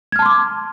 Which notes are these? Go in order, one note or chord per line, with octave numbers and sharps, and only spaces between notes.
A5 C6 D6 F6 G#6